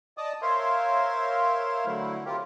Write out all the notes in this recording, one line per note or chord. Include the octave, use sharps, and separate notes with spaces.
D5 D#5 A5 D6 D#6
A#4 C5 C#5 E5 F5 C6
D3 F#3 A3 E4
C4 F4 G4 A#4